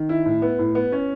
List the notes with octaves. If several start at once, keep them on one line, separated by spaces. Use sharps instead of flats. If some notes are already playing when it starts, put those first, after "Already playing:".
Already playing: D#3
E4
A2
B3
A2
B3
C#4